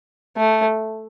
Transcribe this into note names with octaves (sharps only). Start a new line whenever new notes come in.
A3